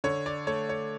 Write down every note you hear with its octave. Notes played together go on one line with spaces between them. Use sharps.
D3 C#5
D5
A3 C#5
C#5